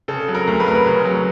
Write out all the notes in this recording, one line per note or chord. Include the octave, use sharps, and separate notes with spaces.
C#3 A4
F#3
A#4
D2
B4
D2 A#4
B4
C#3
F#3